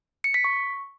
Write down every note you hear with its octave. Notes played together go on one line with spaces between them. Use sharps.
C#7
B6
C#6